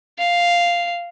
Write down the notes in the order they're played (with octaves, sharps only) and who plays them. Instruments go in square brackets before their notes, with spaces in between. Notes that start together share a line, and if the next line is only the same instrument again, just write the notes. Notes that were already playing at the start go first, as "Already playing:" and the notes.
[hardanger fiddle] F5